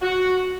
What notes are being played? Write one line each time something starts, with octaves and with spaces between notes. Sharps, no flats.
F#4